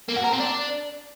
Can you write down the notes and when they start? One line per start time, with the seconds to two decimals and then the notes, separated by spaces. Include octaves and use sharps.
0.09 A#3
0.17 F#4
0.25 A#4
0.32 C4
0.40 D4